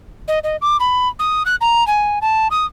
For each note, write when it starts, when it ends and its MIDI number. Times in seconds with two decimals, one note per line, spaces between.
0.28 0.39 75
0.44 0.56 75
0.62 0.77 86
0.80 1.08 83
1.19 1.43 87
1.46 1.56 90
1.61 1.86 82
1.87 2.19 80
2.22 2.48 81
2.51 2.66 87